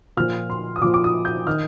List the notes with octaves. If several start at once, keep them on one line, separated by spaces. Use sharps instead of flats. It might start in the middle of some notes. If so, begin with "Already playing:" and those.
A#2 F3 F6
C6
D#6
A#2 F3 D6
D6
D#6
G6
D#3 F6